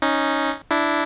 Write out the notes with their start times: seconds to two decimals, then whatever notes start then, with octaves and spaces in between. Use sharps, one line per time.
0.02 C#4 D#4
0.71 D4 E4